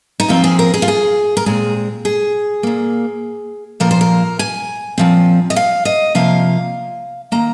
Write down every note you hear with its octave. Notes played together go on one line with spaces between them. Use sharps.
D#4
A#2 F3 C4 F4
G#4
A#4
G#4
F4
G#4
A#4
A#2 G#3 C4 G#4
G#4
A#2 A#3
A#2 F3 A#3 A#4
C5
A#4
G#5
A#2 F3 C4
D#5
F5
D#5
C3 F3 A#3 F5
D#3 A#3 A#5